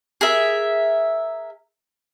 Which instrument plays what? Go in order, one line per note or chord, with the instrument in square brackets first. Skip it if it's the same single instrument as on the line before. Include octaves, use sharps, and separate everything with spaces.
[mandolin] G#4 A#4 E5